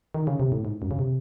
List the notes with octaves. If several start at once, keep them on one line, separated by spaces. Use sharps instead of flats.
D#3
C#3
C3
A2
G#2
F#2
C#3
C3